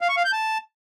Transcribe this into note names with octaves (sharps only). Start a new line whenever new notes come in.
F5
C#6
F5
G6
A5